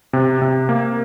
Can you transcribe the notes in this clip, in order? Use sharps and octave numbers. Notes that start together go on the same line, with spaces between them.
C3
C3
A#3